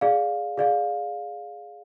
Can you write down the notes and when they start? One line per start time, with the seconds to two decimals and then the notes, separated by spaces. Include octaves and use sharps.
0.01 G#4 D5 F5
0.57 G#4 D5 F5